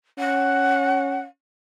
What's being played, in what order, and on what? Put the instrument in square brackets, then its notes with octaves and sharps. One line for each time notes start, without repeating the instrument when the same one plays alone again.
[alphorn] C#4 [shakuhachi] F#5